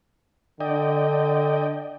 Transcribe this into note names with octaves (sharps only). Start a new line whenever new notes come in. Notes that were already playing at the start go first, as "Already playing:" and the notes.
D3 D5 D#5 G5